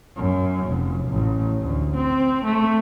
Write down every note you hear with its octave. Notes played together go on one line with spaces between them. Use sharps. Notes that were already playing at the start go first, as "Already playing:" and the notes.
F#2
F1
A1
D2
C4
A3